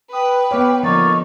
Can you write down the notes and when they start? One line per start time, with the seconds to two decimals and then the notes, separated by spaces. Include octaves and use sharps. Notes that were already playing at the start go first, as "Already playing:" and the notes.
0.13 B4 G5 D#6
0.51 B3 G4 C#5 F5
0.83 D3 F3 A#3 D#4 D5 C#6